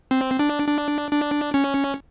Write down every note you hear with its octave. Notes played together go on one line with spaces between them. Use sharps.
C4
D4
D4
D4
C#4